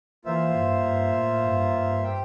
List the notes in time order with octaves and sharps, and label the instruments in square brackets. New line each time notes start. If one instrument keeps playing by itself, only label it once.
[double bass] E3 [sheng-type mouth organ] A#3 F4 C5 E5
[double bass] G2
G2
A2
G2
G2
[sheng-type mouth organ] G4 C5 G5